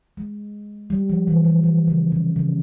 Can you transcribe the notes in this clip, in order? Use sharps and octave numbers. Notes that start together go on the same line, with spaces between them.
G#3
G3
F3
E3
E3
E3
C#3
C3
C#3